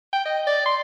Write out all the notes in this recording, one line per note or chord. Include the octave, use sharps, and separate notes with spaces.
G5
D#5
D5
C6